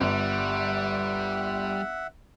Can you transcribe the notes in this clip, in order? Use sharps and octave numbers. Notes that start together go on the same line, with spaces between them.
G1 G3 E5 F#5